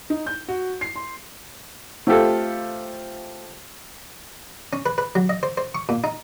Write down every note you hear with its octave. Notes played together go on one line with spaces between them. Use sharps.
D#4
G6
F#4
C7
C6
A3 C4 F4 G4 A4
C#4
B4
B4
F#3
D#5
C5
C5
C#6
A#2
D#4